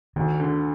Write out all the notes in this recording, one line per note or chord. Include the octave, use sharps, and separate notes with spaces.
D2 D#3
D3